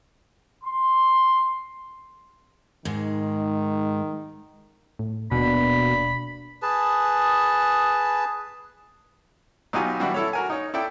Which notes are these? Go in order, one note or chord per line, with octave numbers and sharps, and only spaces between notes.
C6
G#2 D#3 G#3
A2
D#1 B2 A#3 D4 B5
G#4 B4 A5
B2 F#3 D#4 F4 G4 G#5
E3 G3 D4 E4 F#4
E4 A4 C#5
F#4 A#4 G#5
D#4 C#5
E4 A4 D5 G5 E6